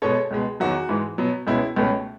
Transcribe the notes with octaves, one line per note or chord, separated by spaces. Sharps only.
B2 G#3 B3 A4 C#5
C#2 B2 G#3
E2 D#3 F#3 F#4
G#2 E3 G#3
B2 F#3 B3
C#2 B2 G#3 C#4 E4
C#2 B2 A3 C#4